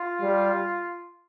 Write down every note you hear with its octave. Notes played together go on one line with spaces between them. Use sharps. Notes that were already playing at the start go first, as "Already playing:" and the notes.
Already playing: F4
G3